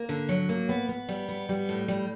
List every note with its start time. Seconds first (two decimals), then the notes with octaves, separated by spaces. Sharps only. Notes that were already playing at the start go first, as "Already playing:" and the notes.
Already playing: A#3
0.09 D3
0.29 F#3
0.49 A#3
0.69 B3
0.89 B3
1.09 G3
1.28 B3
1.49 G3
1.69 A2
1.88 G3